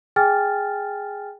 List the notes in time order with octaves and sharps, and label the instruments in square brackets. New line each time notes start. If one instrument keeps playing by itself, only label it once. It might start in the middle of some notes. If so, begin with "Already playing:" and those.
[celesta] G#4 G5 G#5 F6 A6